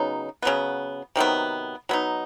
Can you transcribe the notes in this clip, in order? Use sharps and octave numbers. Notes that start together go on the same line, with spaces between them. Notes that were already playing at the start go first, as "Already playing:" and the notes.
Already playing: C#3 F#3 B3 D#4
C#3 F#3 B3
C3 D#3 F#3 B3
F#3 B3 D#4